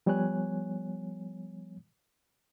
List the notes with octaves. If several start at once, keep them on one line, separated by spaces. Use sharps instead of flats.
F3 G3 B3 C#5 G#5 F#6